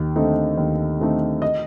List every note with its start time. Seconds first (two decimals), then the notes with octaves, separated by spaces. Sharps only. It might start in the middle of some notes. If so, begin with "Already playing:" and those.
Already playing: D#2
0.16 D3 A3 C4 D#4
0.57 D#2
1.00 D3 A3 C4 D#4
1.42 D#5